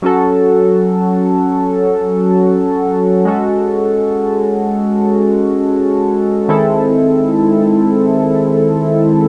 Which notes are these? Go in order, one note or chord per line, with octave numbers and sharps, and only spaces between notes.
F#3 C#4 F#4 A4
G#3 C#4 F#4 A4
D#3 G#3 C4 E4 A4